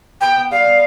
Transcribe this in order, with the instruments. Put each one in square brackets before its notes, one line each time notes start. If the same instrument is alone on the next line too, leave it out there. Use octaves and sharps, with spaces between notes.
[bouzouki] B3 [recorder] G5
[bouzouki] B3
[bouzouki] G3 [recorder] F5
[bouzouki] B3